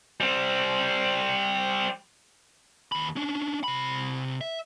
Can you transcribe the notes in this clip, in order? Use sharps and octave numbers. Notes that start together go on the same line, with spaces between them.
G3 C4
D#2 B5
C#4 D4
C3 B5
E5